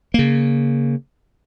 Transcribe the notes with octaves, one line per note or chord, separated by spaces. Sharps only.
C#3 A#3